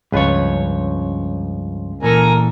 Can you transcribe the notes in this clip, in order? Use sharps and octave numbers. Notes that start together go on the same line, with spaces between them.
C#2 G2 F3 B4 C#5
A#2 E3 A4 A#4 G#5 A#5